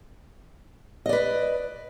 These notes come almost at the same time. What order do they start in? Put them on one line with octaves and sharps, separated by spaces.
D#5 D5 B4